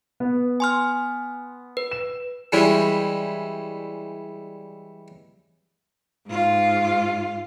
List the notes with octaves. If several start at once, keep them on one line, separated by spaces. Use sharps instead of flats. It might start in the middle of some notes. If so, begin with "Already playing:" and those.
B3
G#5 C6 F6
B4
E7
E3 G3 G#3 C#4 E4
G#2 F4